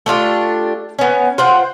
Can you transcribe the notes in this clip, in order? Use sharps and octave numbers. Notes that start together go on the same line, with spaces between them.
A3 D4 F4 G4
B3 C#4
F4 C5 F#5 G5